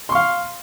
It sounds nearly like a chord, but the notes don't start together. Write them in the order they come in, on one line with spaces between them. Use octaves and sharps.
C6 C#6 F5